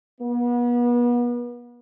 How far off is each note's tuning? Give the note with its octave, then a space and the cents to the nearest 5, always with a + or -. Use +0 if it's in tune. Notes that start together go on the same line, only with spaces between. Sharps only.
B3 -35